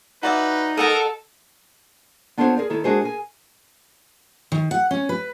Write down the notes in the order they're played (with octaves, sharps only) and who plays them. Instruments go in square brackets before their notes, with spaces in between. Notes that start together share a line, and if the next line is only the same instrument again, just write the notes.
[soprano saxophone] D#4 [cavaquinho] F#4 D5 E5 [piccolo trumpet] B4
[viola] A4 [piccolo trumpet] A#4 [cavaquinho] D#5 F#5 A5
[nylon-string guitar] B3 D4 F4 A4 C5 C#5
G#4 A#4 D5
D#3 E4 A4 C#5
G#3 D4 F#4 G#4 A#4 C5
G#4 A#4 G#5
[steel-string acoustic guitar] D#3
F#5
C#4
B4